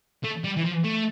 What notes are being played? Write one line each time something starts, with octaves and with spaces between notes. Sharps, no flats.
A3
G3
E3
F3
A3